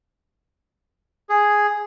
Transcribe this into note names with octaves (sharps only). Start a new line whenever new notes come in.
G#4